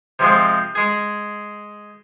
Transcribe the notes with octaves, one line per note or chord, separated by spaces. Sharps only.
C3 F3 G#3 C4
G#3 G#4